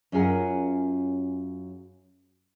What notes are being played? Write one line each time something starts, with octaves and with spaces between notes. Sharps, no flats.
F#2 C#4 F4 G#4 A#4 F#5